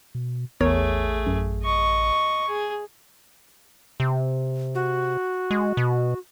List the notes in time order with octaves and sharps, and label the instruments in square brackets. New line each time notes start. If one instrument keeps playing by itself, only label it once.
[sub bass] B2
[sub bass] A1 [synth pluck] E2 A#4 C#5 [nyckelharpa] A3 G#4
[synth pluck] F#2
[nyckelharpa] D#5 C#6
G#4
[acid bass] C3
[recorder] F#4
[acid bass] G#3
B2